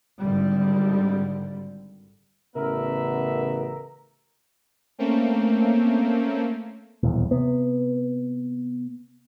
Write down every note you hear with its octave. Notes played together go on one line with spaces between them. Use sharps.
G#1 D3 G3
A1 C#3 B3 A#4 B4 E5
A3 A#3 C4 C#4
D#1 B1 E2
C3 B3